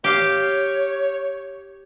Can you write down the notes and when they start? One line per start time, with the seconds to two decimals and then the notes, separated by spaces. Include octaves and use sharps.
0.04 G4 C#5 F5